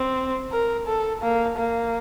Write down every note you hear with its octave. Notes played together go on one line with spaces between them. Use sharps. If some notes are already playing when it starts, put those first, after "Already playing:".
Already playing: C4
A#4
A4
A#3
A#3